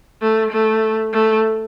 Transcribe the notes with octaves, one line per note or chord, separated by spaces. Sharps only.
A3
A3
A3